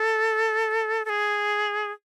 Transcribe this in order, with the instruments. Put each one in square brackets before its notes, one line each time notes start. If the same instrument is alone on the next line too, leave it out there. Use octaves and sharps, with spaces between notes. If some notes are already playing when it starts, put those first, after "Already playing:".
Already playing: [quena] A4
A4
G#4